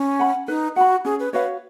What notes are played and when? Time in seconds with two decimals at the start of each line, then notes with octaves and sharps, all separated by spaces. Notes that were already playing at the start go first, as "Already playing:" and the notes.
Already playing: C#4
0.19 F#5 B5
0.48 D#4 B4
0.76 F#4 F#5 B5
1.05 C#4 G#4
1.20 B4
1.33 F#4 B4 C#5 F5